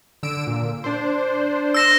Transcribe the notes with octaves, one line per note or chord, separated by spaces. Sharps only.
D3 E6 D7
A#2
D4 C5
E6 A#6 E7